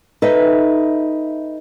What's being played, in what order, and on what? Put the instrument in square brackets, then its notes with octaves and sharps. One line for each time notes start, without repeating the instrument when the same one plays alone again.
[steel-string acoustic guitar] D#4 A4 B4 D#5 E5